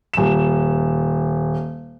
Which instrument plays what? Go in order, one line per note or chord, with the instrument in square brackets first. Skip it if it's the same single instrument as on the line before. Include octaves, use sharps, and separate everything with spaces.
[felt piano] D#1 E7